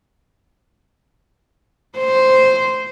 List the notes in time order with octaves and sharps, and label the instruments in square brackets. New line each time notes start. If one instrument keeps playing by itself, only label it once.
[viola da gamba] C5